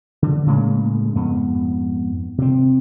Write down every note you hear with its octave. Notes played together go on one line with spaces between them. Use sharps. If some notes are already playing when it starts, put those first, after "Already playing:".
D3
A2 C#3 G#3 A#3
F2 G#2 B3
C3 C4